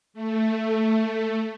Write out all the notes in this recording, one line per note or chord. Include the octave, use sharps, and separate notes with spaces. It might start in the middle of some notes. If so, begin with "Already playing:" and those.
A3